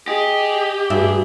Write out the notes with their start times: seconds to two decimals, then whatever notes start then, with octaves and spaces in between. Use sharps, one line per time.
0.08 G4 G#4 D#5
0.90 G2 F#4 G#4 E5